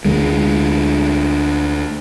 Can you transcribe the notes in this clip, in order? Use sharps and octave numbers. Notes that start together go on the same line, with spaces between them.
D2 G#3